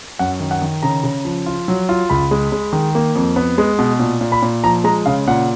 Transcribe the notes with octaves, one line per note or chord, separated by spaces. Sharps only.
F#2 F#5
D#3
F#5
D#3
C#3 A#5
C#3
F3
F4
F#3
F4
C#2 B5
G#3
G#3
D#3
A#3
F2
B3
G#3
B2
A#2
A#2
B5
A#2
F3 A#5
G#3 A#5
C#3 F5
A#2 F#5